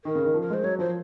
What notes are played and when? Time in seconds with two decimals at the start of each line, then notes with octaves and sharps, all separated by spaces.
0.05 D#3 A#4
0.15 C#3
0.25 D#3
0.34 F3
0.42 A#4
0.50 G#3 C5
0.64 F#3 C#5
0.79 F3 C5